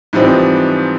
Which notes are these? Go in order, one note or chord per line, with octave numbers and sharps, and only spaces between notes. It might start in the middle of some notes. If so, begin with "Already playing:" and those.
G#2 E3 F3 G3 C4 D#4